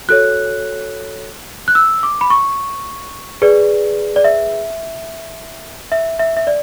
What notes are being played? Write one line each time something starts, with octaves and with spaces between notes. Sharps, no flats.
F#4 A4 C#5 F#6
F#6
E6
D6
B5
C#6
G#4 B4 D5
D5
E5
E5
E5
E5
D5